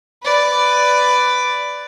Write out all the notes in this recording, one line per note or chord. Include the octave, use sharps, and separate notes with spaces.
B4 D5